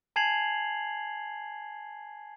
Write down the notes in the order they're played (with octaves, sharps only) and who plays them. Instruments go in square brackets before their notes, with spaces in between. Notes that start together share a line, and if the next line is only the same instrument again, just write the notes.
[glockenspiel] G#5 A5 G#6 C7 F7 F#7